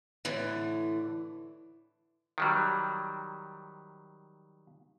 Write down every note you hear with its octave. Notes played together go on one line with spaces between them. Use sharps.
A2 D3 E3
D#3 F#3 G3